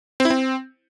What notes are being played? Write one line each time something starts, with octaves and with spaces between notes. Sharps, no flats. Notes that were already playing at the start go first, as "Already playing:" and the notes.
C4
E4
C4